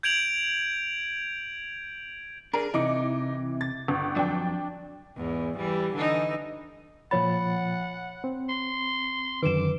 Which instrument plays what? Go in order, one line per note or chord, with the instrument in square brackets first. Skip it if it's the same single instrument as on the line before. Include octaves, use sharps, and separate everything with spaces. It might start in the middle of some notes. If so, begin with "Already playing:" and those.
[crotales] G6 G#6 D7 F7 F#7
[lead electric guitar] D4 G#4 [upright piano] A#4
[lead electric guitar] C3 [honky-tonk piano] E3 D6 C#7 [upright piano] D#4
[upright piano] A6
[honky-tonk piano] G1
[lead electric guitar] F2 F#3 [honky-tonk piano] D4 G5
[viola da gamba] E2 G#2
E3 G3
D3 E3 D#4
[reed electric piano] A#2 F3 A6 [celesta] C#5 B5 [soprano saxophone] F#5
[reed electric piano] C4
[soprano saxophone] C6
[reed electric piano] F#2 D3 D#3 [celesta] B4 E7 [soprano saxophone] D6